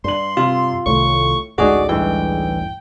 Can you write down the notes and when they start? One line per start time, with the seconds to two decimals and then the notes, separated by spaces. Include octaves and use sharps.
0.04 G2 D4 C6 F#7
0.37 C3 F4
0.86 C2 A2 C3 D#3 C#6
1.58 A1 D2 A2 G#3 D#4 F#4 G#4 D5
1.89 G2 E3 G5